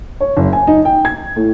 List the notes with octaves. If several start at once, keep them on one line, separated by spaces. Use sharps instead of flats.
C#5
F#1
G#5
D#4
G5
G#6
A2